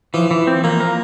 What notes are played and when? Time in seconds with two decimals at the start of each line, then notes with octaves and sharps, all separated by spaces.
0.14 E3 F3
0.31 E3
0.47 C4
0.64 A#2 A#3
0.80 A#4